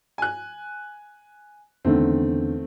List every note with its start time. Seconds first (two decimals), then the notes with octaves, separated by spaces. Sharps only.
0.18 G#5 F#6
1.85 E2 D3 D#3 A3 C4